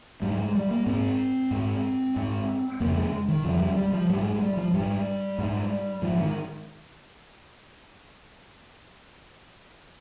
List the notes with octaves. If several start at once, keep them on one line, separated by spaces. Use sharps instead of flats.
G#2 G3
G#3
G3
A#3
G#2 C4
G#2
G#2
F2 C#3 A#3
G#3
D#3
F2 C#3 F3
G3
G3
F3
G#2 G3
G#3
G3
F3
G#2 G3
G#2
G#2 F3
D#3